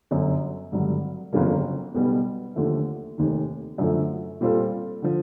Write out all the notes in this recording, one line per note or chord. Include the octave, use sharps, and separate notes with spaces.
G1 F#2 D3
G#1 G2 D3 F#3
G1 F2 C#3 F#3 A#3
B1 B2 G3 B3
D#2 D3 F3 A3
F1 D#2 D#3
F#2 D3 F3 A3
A#2 G3 C4 F4 A4
D3 F3